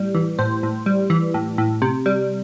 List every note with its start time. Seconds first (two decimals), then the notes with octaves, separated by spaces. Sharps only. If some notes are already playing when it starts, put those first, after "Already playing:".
Already playing: A2 G3
0.15 E3
0.39 A2 C5
0.63 A2
0.86 G3
1.10 E3
1.34 A2
1.58 A2
1.82 C3
2.06 G3